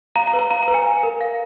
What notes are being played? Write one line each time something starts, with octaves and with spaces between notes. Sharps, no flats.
F5 A#5
A#5
B4
A#5
F5 A#5
A#5
B4
G#5
F5
A#4
F5